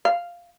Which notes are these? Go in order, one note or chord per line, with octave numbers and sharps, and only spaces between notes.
F5